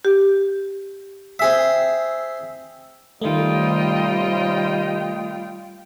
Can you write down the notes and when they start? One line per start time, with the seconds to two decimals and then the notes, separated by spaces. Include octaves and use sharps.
0.05 G4
1.39 C4 G#4 E5
3.22 D#2 C3 D#3 G3 A3 F4 D#5 G5